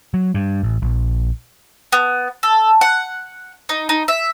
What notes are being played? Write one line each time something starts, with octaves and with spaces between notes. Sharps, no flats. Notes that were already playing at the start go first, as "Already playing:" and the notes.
F#3
G2
A1
A#1
B3
A4
F#5
D#4
D#4
E5